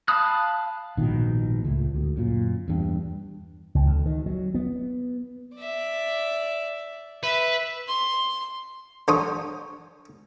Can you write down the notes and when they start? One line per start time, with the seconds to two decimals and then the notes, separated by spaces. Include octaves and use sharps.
0.08 F5 A5 B5 D#6 F#6
0.97 A#1 G#2 B2 D#3
1.64 C#2 A2
1.94 D2
2.17 F#2 A#2
2.68 E2 G2
3.75 C#2
3.86 D2
4.06 D#3
4.26 F#3
4.54 B3
5.55 D5 E5
7.23 B4 E5
7.88 C6
9.08 D3 C5 C#5 G#5 D#6